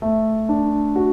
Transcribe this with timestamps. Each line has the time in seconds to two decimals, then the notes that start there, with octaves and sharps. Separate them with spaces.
0.02 A3
0.49 D4
0.96 F#4